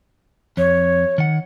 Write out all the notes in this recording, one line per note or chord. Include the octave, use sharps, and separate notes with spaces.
F2 C#5
D#3 F#5